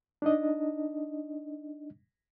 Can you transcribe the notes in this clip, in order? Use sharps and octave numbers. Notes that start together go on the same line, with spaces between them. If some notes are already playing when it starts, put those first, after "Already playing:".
D4 D#4 D#5